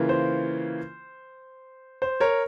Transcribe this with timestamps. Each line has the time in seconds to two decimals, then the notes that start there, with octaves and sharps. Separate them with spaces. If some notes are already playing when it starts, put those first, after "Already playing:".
Already playing: C#3 E3 A#3 F4
0.09 C5
2.02 C5
2.20 A#4 C#5